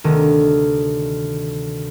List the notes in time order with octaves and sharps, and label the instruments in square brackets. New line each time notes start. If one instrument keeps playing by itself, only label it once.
[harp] D2 C3 D#3